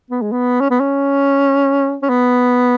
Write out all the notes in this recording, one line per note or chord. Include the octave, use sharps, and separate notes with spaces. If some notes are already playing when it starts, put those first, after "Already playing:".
B3
G#3
B3
C#4
B3
C#4
C#4
B3